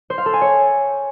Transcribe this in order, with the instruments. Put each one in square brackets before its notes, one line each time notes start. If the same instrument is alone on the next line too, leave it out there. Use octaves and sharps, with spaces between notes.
[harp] C5
F5
A4
G#5
C#5